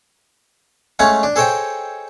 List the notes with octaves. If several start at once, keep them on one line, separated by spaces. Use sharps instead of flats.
G#3 A3 C#4 C#5 F5 F#5
D4
G#4 A4 C5 C#5 D#5 G5